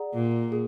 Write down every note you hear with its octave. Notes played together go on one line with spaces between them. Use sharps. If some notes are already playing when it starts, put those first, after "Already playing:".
Already playing: G#4 D5 F#5 A#5
A#2
G#4